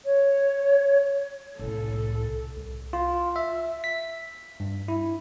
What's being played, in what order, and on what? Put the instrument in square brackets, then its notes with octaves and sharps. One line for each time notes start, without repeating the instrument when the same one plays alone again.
[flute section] C#5
[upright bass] C2 A2 [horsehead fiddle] A4
[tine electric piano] C2
F4
E5
B6
G2
E4